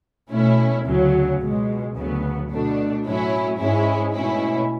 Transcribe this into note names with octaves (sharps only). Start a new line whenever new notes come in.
B2 A3 C#4 E4
D2 C#3 F#3
C#2 B2 G#3
D2 C#3 F#3 B3
B2 A3 D4
A2 F#3 C#4 E4
G#2 G#3 C#4 E4
B2 A3 C#4 E4